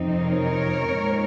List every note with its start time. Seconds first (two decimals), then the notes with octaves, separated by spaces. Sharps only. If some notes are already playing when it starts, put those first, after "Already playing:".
Already playing: F2 C3 F3 C4 D#4
0.21 A#4 C#5
0.91 A#2 G#3 C4 D#4